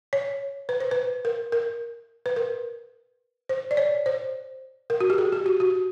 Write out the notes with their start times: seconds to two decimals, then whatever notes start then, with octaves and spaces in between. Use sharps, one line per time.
0.13 C#5
0.69 B4
0.80 C5
0.91 B4
1.25 A#4
1.52 A#4
2.26 B4
2.36 A#4
3.49 C5
3.71 D5
3.77 C#5
4.06 C5
4.90 A#4
5.00 F#4
5.10 G4
5.18 G#4
5.32 G4
5.46 F#4
5.60 F#4